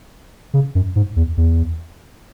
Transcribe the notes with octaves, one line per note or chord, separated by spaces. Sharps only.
C#3
F#2
G#2
E2
E2